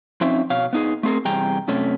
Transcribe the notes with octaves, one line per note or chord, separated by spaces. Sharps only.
F3 C4 C#4 D#4 E5
B2 C#5 F5
B3 D#4 G#4
A3 C4 G#4 A#4
E2 C3 G3 G#4 G5 A#5
F#2 C3 A3 C#4